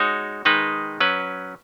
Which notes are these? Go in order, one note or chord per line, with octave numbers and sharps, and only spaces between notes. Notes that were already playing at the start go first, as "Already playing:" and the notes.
Already playing: G#3 D#4 F#4 C#5
D#3 G#3 D#4 B4
F#3 C#4 B4